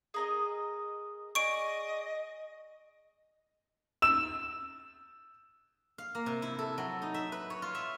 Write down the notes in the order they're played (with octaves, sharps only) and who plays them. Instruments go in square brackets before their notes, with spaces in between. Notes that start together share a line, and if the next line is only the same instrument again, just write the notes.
[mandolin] G#4 A#4 D#5
[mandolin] G#4 D5 [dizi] D#5 [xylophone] C#6 D7
[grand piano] E6 E7
[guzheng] F5
A#3
C3
E4
A4
F#3
D#4
E5
B4
C#5
F4
E5